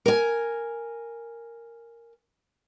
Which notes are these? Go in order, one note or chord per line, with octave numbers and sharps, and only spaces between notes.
A#4 G#5